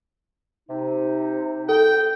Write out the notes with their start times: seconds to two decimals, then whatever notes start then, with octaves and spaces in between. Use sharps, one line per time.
0.70 C3 D#4
1.69 A4 G5